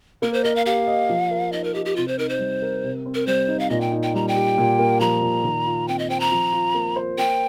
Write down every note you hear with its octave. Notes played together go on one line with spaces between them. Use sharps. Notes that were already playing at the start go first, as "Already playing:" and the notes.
A#3 A#4
C5
A#4 D#5
F5
G4 F5
D#5
F3
A#4
D#4 D#5
A#4
G4 D#5
G4
C3 F4
C5
D#4 A#4
C5
G3
A#4
C3
C4
A#4
G3 C5
D#4
F5
A#2 D#5
G5
D#4
G5
G3 A#5
G5
G4
A#2
A#3
F3 A#5
A#2
D#3
F4
C4 G5
D#5
C5 G5
A#5
F3
F4
A#3
C5
A#3 G5